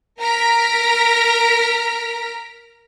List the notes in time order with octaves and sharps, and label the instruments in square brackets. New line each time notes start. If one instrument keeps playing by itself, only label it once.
[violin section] A#4 A#5 F6 A#6 B6 D7